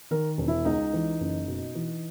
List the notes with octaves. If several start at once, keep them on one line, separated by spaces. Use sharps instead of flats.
D#3 A#4
E1
E4
C#2 D#4
E3
F#1
B2
E3